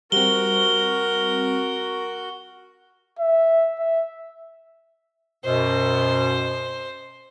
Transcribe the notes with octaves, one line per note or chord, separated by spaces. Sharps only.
G3 C4 F#4 A#4 G7
E5
E5
F#2 B2 C5